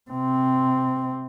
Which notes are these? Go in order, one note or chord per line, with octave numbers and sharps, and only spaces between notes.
C3 C4